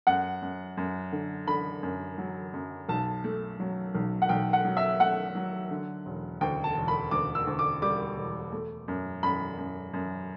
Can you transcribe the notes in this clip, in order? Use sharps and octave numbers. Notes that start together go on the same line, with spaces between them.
F#2 F#5
F#2
F#2
D3
D3 B5
F#2
F#3
F#2
B1 A5
A3
F#3
B1
F#5
B1 G5
F#5
F#3
E5
A3 F#5
F#3
D3
E1
D2 G5
A5
E1
B5
D2 D6
E6
D2
D6
G3 D6
E1
A3
F#2
F#2 B5
F#2
F#2